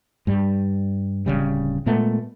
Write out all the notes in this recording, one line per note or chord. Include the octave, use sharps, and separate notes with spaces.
G2 G3
D1 B1 C#3 G3
A#2 G#3 A3 B3